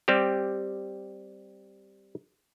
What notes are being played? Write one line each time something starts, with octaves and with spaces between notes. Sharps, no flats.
G3 C4 G4